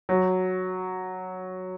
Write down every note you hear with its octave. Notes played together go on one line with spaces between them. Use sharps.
F#3